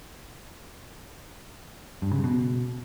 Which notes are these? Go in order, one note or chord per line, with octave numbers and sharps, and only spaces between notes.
G2
C#3
B2